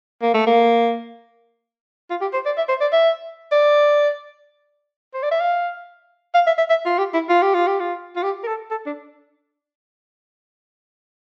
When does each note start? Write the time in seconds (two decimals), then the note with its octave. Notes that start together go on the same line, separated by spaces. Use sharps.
0.22 A#3
0.34 A3
0.47 A#3
2.10 F4
2.21 G4
2.33 C5
2.46 D5
2.57 E5
2.69 C5
2.81 D5
2.93 E5
3.52 D5
5.14 C5
5.23 D5
5.31 E5
5.41 F5
6.34 F5
6.47 E5
6.58 E5
6.70 E5
6.86 F4
6.98 G4
7.14 E4
7.29 F4
7.42 G4
7.54 F4
7.67 G4
7.80 F4
8.16 F4
8.23 G4
8.43 A#4
8.47 A4
8.71 A4
8.86 D4